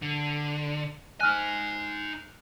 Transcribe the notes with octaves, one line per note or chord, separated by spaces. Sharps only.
D3
D#4 G#5 F6 F#6